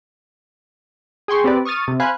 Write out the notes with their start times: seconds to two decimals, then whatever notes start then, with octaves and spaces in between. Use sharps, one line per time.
1.28 G#4 G5 C6 C#6
1.44 C4 G4 B4 D5
1.65 C#6 D#6 F6 A6 D#7
1.88 C3
2.00 C5 F5 G#5 B5 F#6 G#6